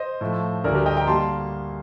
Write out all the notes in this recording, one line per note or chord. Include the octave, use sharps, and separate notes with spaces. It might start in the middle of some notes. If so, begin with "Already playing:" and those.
Already playing: C5 D#5
A2 F3 A3
D2 D3 G3 A#4 D5
G4 A#4
D#5 G5
G5 A#5
D3 G3 A#3 A5 C6